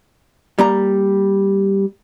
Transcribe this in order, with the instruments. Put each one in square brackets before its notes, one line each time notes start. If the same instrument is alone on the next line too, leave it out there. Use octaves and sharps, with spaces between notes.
[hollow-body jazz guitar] G3 A#3 A#5